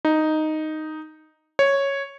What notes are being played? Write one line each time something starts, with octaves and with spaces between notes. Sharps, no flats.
D#4
C#5